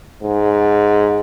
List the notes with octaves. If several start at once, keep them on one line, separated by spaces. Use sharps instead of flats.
G#2